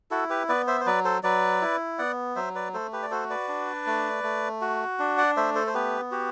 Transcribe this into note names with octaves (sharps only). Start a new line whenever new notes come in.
E4 F#4 A4
G4 B4
B3 B4 D5
C5 E5
C5
F#3 B4 D5
A4 C5
F#3 B4 D5
E4
B3 D5 F#5
F#3 C5 E5
B4 D5
A3 A4 C5
G4 B4
D5
F#4 A4 C5
B4 D5
D4
A3
A3
F#4
D4
D5 F#5
A3 C5 E5
A4 C5
C5
B3 G4 B4
F#4 G4